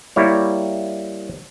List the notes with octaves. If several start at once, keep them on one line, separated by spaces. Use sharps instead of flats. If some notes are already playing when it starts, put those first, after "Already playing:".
G3 A#3 E4 C#5